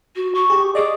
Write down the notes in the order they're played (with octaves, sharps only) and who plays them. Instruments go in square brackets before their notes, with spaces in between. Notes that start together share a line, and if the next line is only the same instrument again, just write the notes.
[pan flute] F#4
C#6
[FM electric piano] G4 G#4
[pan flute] G#4 [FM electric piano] D5 D#5 D6